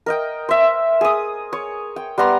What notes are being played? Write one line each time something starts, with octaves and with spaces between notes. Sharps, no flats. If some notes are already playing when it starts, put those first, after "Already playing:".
A#4 D#5 G5
C5 E5
G#4 D#6
C#5
G5
G3 B3 A#5 C6